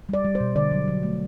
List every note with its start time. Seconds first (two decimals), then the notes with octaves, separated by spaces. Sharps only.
0.09 G3 D5
0.25 G3
0.35 C5
0.40 B2
0.56 D3 D5
0.71 F#3
0.88 F#3
1.03 A3